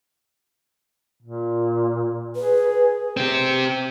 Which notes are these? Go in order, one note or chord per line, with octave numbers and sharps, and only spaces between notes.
A#2
G#4 B4
C4 G4